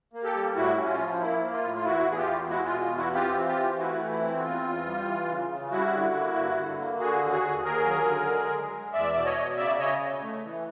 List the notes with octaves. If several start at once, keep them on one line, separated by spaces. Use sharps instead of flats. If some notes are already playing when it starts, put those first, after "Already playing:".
A#3
G4 A4
G3
A2 E4 F#4
C#4
F4
F3
A#3 E4
A#3
F4
A2
F4
E2 E4 F#4
E2
G#4
F4 G4
E2
G#3 E4 F#4
F4
B2
F4
E2
E4 F#4
C4 F4 G4
E3
F4 G4
E3
A3 E4 F#4
E3
E4
C4
F#4
E2 F4
E2
G3
E3
C#3
C#3
G3 E4 F#4
D3
A#3
G2
D3
A#3
D3 F#4 G#4
D#2
F#4 G#4
D#2
D#2 G#4 A#4
F#3
D3
G#3
G#3
G#3
E2 D5 E5
B2 D5
C#5 D#5
B2
C#3 D5 E5
C#3 C#5 D#5
C#3
A3
E3